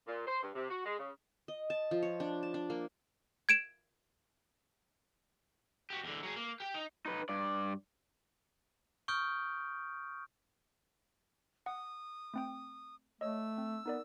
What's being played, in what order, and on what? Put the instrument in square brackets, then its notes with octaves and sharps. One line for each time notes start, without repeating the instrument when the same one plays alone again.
[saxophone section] A#2
C5
G2
C3
F#4
G#3
C#3
[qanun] D#5
A5
F3
C#5
D4
A5
D4
A#3
[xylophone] G#6 D7 E7
[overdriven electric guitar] F#4 G4
E2 D3
F#3 G#4
A#3
G4 G5
D#4
D#4 B4
G2 D5
[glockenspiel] C#6 D#6 F6 G6 D7
[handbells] F#5 [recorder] D#6
[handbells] A3 C4 G5
[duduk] A3 [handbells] C#5 D#5 [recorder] E6
[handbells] C4
[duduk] B3 [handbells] D#4 A#4 D5